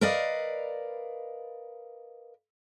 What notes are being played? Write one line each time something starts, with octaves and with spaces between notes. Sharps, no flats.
A#4 B4 D5 D#5 F5